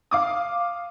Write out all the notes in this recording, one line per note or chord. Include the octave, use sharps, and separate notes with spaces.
F5 D6 D#6